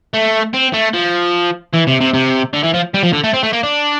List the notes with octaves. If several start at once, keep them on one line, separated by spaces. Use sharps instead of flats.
A3
C4
A3
F3
E3
C3
C3
C3
D3
E3
F3
G3
F3
D3
A3
C4
A3
A#3
D4